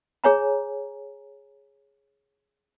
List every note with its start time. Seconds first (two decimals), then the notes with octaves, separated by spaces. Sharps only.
0.24 G#4 C#5 G#5 A#5